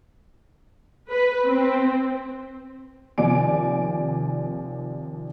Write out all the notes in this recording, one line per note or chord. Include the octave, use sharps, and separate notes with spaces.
B4
C4
D#2 C3 F3 D5 G#5 D7